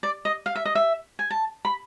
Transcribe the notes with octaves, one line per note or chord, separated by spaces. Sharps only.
D5
D#5
F5
E5
D#5
E5
G#5
A5
B5